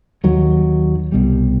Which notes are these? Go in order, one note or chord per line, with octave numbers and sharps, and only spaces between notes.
D#2 D#3 F#3
C2 B2 G3